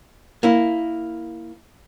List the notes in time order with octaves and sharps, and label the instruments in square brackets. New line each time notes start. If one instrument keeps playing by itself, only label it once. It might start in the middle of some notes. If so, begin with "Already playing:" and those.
[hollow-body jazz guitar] A#3 E4